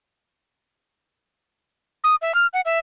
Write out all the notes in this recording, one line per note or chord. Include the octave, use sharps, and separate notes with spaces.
D#6
E5
F6
F#5
E5